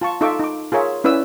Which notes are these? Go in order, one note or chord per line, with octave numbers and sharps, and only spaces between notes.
F4 A5 C#6
D#4 F4 A4 E5 C#6 D6
D#4 D6
F4 G#4 A#4 C#5 E5
C#4 E4 B4 D5 E6